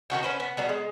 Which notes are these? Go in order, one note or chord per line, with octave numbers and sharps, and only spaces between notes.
D#3 E4 F#4 G5
C#4 B4 C5
B3
F#3 G3 B3
G#3